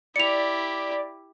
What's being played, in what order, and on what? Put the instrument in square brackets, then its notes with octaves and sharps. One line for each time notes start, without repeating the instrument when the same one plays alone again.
[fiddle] E4 G4 [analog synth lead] D5 [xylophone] C#7 F7